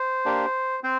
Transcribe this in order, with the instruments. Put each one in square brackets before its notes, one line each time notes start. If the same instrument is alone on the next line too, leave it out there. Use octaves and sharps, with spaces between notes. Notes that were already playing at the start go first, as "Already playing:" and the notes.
Already playing: [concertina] C5
A#3 D4 G4
C4 C5